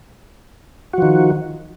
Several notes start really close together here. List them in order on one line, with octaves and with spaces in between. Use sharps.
F#4 F3 D#3